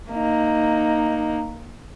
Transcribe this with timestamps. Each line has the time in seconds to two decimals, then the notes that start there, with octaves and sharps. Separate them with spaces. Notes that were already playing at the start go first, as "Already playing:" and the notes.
0.11 A#3 D#4